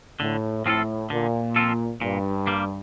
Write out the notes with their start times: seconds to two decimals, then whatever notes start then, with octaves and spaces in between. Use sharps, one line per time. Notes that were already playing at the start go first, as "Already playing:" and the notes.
0.20 A2 D3
0.65 A2 F3 C4 F4 A4
1.10 A#2 D3
1.56 F3 C4 F4 A4
2.01 G2 A#2
2.47 G3 A#3